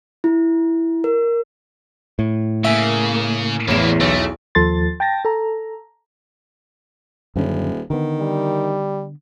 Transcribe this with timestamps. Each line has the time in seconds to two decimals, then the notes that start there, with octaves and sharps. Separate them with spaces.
0.24 E4
1.04 A#4
2.19 A2
2.65 C#3 A#3 E5
3.68 A1 E2 B2 A#3 E7
4.00 B1 A3
4.55 D#2 F3 A4 C6 A6
5.00 G5 A5 A6 A#6
5.25 A4 A#5
7.36 D#1 F#2 D3 C#4
7.90 D3 D#3 B3
8.20 G3